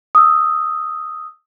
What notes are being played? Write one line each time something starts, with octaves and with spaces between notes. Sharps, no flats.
D#6 E6